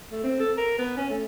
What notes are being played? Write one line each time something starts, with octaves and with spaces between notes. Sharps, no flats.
A3
C4
A4
A#4
B3
C#4
A3